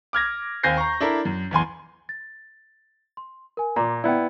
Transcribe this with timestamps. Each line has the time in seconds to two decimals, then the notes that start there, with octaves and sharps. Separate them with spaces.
0.13 D6 F6 G#6 A#6
0.63 D#2 C4 G#5 G6 A#6 C7
0.77 A#5 C#6
1.00 D4 E4 A4 A#4
1.25 F#2
1.51 B1 E2 G#5 C6
2.09 A6
3.17 C6
3.57 A#4 G#5
3.76 A#2 A#5 C6 D6
4.04 B3 E4 D5 G5